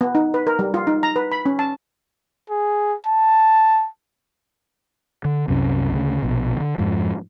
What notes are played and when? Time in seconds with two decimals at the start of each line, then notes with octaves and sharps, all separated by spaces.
0.01 B3
0.15 D#4
0.34 B4
0.47 A#4
0.59 G3
0.74 F4
0.87 D#4
1.03 A#5
1.16 B4
1.32 B5
1.46 C#4
1.59 A5
2.50 G#4
3.07 A5
5.25 D3
5.48 C2 F#2 C3 C#4
5.93 D2 C#3
6.23 A#1 B2
6.57 D3 D#3
6.78 F2 G#2 F3